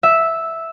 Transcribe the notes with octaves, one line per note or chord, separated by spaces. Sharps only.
E5